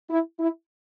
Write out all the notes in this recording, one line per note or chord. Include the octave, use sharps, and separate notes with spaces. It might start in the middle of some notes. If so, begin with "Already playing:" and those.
E4
E4